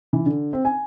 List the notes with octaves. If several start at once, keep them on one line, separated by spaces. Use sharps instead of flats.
E3
D3
C4
G#5